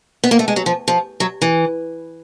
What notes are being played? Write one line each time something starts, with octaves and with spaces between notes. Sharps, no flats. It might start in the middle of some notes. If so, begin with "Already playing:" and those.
B3
A#3
A3
G#3
F#3
F3
F3
F#3
E3